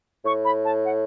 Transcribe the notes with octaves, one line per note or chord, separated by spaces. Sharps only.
A2 C#6
B5
A5
F#5